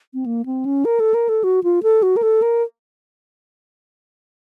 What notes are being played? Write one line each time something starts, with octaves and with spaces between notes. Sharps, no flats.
C4
A#3
C4
C#4
A#4
A4
A#4
A4
F#4
F4
A4
F#4
A#4
A4
A#4